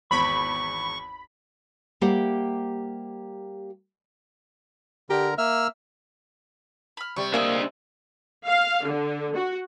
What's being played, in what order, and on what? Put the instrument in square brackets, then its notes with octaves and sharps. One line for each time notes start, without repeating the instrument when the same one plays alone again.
[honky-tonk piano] G#1 E2 [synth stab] B5 [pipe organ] C#6
[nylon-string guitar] G3 A#3 G4 C5 E5 F#5
[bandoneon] D3 A#4 A#5 [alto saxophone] G4
[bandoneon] A#3 E6 F6 [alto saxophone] E5
[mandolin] B5 F6
[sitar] C3 G3 [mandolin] C#6
[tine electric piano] A#3 [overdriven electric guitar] D4 E5 [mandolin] G#4 D#5 C6
[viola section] F5
D3
F#4